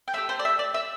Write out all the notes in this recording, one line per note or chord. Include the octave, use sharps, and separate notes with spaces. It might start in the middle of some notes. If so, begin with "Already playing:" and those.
G5
A3 D4 G4 E5
C5
D5
E5
D5
E5